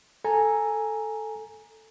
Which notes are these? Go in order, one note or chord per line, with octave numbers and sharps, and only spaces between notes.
A4 G#5 A#5